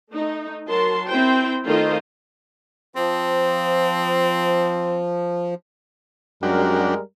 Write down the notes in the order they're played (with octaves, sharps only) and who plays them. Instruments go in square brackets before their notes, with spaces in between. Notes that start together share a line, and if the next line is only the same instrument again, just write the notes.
[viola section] A3 D#4
F#3 A#4 A5 C6
C4 E4 C5 G5
D#3 A3 F4 A4 C5 D#5
[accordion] F3 [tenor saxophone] C4
[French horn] F#2 [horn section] G3 G#3 A#4 [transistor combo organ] D4 F#4 G4